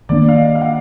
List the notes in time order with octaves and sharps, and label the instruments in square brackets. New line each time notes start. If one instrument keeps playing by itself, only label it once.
[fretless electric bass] D#3 A#3 D4 [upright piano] D5
[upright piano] F5
D#5
F5
F#5